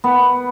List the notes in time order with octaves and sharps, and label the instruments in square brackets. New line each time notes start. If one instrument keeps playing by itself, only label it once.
[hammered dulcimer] B3